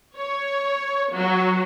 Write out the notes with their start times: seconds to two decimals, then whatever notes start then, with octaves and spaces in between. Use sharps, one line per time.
0.16 C#5
1.14 F#3